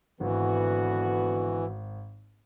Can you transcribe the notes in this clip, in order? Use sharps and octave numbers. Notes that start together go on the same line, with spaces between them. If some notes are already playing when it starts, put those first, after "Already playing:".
G#1 D3 E3 B3 F#4